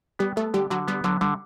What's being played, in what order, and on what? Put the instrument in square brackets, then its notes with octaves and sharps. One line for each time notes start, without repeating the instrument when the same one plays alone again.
[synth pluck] G3 G4 [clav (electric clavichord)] B3
[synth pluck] A3 A4 [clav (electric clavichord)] B3
[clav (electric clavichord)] D3 [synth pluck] G3 G4
[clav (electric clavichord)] D3 [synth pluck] F#3 F#4
[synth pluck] G3 [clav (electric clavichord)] B3
[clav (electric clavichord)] D3 [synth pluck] F#3
[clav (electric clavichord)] D3 [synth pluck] G3